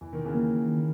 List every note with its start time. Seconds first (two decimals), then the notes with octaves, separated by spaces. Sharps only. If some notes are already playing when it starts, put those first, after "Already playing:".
0.01 E2 E3
0.13 D#3
0.25 C#3 E3
0.35 A#3
0.68 D#3